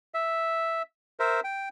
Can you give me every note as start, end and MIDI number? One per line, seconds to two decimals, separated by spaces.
0.14 0.82 76
1.20 1.40 70
1.20 1.40 72
1.20 1.40 76
1.44 1.69 79